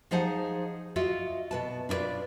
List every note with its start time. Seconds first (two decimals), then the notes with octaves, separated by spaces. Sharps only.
0.11 F3 D#4 G#4 C5 F#5 A5
0.96 F4 F#4 D#5 E5
1.51 B2 B4 A5
1.89 D4 E4 F4 B4 D5